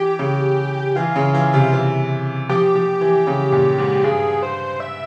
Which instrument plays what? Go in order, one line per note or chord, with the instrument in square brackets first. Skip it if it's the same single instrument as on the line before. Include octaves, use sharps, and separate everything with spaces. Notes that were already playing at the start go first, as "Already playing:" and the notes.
Already playing: [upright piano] E3 [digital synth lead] G4
[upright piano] C#3
[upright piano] E3 [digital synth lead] F4
[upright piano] C#3
E3
C3
E3
[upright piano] F3 [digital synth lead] G4
[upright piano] F3
E3
C#3
A#2
G#2
[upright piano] G2 [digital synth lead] G#4
[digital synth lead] C5
E5